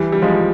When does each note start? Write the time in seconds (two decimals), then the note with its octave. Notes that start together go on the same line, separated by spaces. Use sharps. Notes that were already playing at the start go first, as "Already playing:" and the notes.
Already playing: E3 G3
0.12 G3
0.22 F3 G#3